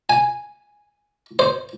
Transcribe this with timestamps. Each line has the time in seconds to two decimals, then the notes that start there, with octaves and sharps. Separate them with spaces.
0.10 G#5
1.39 C5